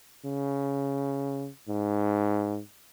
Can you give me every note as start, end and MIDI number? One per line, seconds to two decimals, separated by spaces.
0.25 1.48 49
1.69 2.59 44